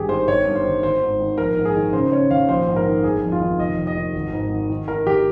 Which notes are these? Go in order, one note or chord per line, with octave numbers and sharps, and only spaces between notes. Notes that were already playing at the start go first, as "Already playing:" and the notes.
Already playing: G#1 G2 G4 G#4
D#3 C5
G1 C#5
G2
C5
D#3
G#1 C5
G#2
D#3
A#1 A#4
G#2
G#4
D#3
C#3 C5
C#3 C#5
D#2 F5
A#1 C5
G#2
A#4
D#3
G1 G#4
F2
F4
D#3
F1 D#5
D#2
D#5
D#3
G#1
G#2
D#3
D#3
D#3 A#4
D#2 G4